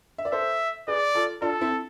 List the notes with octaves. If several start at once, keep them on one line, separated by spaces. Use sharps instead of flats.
E5
D5
A4 C5 E5
G#4 B4 D5
F4 A4
D4 F4 A4
C4 E4